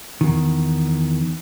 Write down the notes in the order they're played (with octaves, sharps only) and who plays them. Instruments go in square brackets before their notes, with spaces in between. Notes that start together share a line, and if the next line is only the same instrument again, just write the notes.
[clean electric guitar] E2 D#3